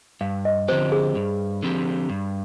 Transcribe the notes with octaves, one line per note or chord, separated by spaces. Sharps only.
G2 F5
D#5
D3 F3 C4 G4 C5
G#4
G2
D3 F3 C4 G4
G2